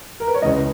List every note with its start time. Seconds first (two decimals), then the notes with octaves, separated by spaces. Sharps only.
0.20 A#4
0.27 B4
0.34 C#5
0.42 C#2 C#3 E3 G#3 D#5